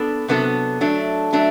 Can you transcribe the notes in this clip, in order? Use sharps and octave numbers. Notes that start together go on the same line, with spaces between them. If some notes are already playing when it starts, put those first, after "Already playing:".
Already playing: B3 D4 A4
C3 F#3 B3 D4 A4
F#3 A3 D4
F#3 A3 D4